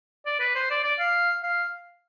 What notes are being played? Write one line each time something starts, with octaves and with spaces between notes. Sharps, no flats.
D5
B4
C5
D5
D5
F5
F5